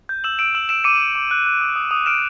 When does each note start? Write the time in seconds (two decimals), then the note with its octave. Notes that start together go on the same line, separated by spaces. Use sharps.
0.09 G6
0.24 E6 E7 F#7
0.39 E6 D7 E7
0.55 E6 E7 F#7
0.69 E6 D7 E7
0.84 D6 C#7 D#7
1.01 D6
1.16 D6
1.31 F#6
1.46 F#6
1.61 D#6
1.76 D#6
1.91 D#6
2.06 F6 D7 E7